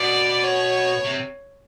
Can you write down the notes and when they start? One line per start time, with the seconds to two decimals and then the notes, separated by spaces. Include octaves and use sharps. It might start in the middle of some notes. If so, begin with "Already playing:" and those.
Already playing: B2 D5
0.44 C#5
1.05 C3